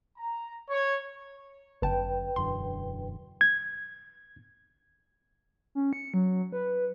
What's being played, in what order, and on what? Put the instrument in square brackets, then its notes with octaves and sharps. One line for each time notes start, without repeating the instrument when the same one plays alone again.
[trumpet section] A#5
C#5
[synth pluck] G1 A5 [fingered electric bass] F#2 [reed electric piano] B4 G5
[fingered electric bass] E1 F#2 D3 [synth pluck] C6
[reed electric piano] G#6
[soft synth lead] C#4
C#7
F#3
B4